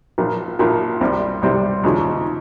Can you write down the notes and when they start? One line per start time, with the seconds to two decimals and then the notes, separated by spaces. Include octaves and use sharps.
0.18 A#1 A#2 F3 A#3
0.59 A#1 A#2 F3 A#3
1.01 C2 C3 G3 C4
1.42 C2 C3 G3 C4
1.83 D#2 C#3 F3